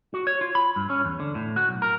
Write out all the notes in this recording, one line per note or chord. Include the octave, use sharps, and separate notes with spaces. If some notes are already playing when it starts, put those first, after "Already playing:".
F#4
C#5
F4
B5
G2
C#4
E2
D3
A2
F#4
B1
A#4